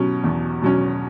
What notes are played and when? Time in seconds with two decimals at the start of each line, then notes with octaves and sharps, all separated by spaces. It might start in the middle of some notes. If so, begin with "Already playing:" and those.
Already playing: B2 F#3 C#4
0.24 E2
0.62 B2 F#3 C#4